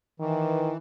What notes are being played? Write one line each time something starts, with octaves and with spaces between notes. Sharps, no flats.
D#3 E3